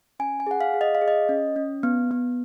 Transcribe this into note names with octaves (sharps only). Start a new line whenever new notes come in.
C#4 G#5
G#5
G#4 F#5
F5
G#4
D#5
F5
G#4
D#5
C#4
C#4
B3
B3